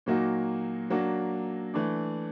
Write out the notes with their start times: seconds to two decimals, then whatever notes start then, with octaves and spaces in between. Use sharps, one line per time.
0.06 A#2 F#3 A#3 D#4 F#4
0.90 F#3 A#3 D4 F#4
1.74 E3 A3 D4